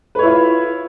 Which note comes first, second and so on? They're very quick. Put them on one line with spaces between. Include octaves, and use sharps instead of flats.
B4 C#5 E4 F4